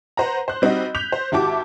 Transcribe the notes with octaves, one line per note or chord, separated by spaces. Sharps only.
B4 C5 F#5 A#5
C5 F#6
G3 C4 D#4 F#4 D#5
F#6 G6 B6 F7
C5
G#1 E4 F#4 G4 A5 D6